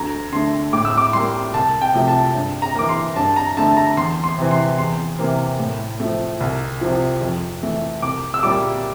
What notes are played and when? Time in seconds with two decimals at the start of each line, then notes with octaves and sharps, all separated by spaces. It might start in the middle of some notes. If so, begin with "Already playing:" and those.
Already playing: D2 A#5
0.32 D3 A3 C6
0.73 A2 D6
0.85 E6
0.97 D6
1.13 G3 A#3 C6
1.54 C2 A5
1.81 G5
1.94 C3 F3 A3
2.08 A5
2.35 G2
2.62 A#5
2.75 E3 A#3 D6
2.89 C6
3.16 G2 A5
3.36 A#5
3.57 D3 A3 A5
3.77 A#5
3.97 E2 C6
4.24 C6
4.38 C3 E3
4.51 C6
4.78 E2 C6
5.19 C3 E3 A#3
5.59 A2
6.00 F3 A3
6.40 C2
6.81 C3 F3
7.21 F2
7.62 E3 A3
8.02 C2 D6
8.34 E6
8.43 A#2 G3 A#3 D6